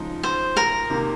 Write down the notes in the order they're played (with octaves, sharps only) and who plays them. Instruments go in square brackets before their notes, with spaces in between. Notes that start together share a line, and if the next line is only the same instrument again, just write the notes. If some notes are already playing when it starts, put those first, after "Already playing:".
Already playing: [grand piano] C#3 F3 G#3 D#4
[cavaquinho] C5
A#4
[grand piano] C3 D#3 A#3